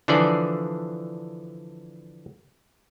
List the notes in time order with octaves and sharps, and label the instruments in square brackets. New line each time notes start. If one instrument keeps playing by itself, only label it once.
[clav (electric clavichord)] D3 E3 F3 D4 G#4 D5